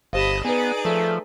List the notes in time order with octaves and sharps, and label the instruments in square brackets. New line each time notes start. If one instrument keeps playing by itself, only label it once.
[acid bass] G1 [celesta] G4 C5 F5 [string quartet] D#5 A5 B5
[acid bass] B3 [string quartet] D#4 G#4 D5 [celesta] B4 G#5
[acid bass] F3 [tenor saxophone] A3